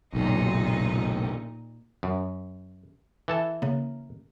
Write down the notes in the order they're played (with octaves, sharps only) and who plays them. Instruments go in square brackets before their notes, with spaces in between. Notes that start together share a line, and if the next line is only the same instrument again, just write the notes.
[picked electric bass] F#1 B1 [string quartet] A#2 D#4
[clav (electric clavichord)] F#2
E3 A4 A5
[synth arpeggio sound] C#3 A#3